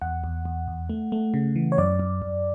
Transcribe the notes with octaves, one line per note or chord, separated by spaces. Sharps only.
E2 F#5
E2
E2
E2
A3
A3
C#3
E3
C#5
F#2 D5
F#2
F#2